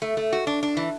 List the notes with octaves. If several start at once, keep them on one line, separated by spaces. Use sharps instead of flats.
A3
A3
F#4
D4
D4
E3